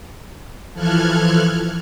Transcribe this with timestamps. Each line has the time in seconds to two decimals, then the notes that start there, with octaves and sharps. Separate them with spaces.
0.73 E3 F3 A4 F6 F#6 G#6